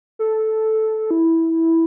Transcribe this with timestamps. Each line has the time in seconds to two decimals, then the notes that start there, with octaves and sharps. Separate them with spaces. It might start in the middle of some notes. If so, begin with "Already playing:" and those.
0.19 A4
1.11 E4